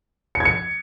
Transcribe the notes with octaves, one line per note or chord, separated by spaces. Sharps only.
C#7
G#6
C#7